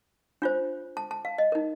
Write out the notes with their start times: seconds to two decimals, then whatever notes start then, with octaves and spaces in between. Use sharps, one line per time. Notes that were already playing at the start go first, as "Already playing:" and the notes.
0.42 D4 F4 C5
0.97 A5
1.11 A5
1.25 F5
1.38 D#5
1.52 D#4 A#4